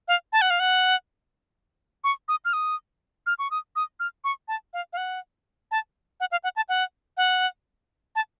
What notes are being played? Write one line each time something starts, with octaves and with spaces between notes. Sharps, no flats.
F5
A5
F#5
F5
F#5
C#6
D#6
F6
D#6
F6
C#6
D#6
D#6
F6
C#6
A5
F5
F5
F#5
A5
F#5
F5
F#5
A5
F#5
F#5
A5